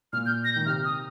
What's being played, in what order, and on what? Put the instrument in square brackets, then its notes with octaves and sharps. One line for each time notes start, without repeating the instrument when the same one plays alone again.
[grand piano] A#2 [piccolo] F6
[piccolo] G6
A#6
G6
[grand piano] D#3
[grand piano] C3 [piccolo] F6
[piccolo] D#6